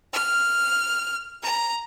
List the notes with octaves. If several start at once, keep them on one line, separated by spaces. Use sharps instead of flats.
F6
A#5